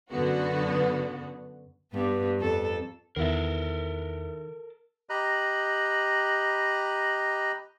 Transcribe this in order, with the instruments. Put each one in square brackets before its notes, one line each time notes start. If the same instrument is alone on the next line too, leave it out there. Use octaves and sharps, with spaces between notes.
[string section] F#2 D3 B3 F#4
[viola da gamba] G2 B3
F2 A4
[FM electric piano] E2 [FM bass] D#3 [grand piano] B3 E4 [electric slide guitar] A4 A#4
[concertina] G4 D#5 A#5 B5 F#6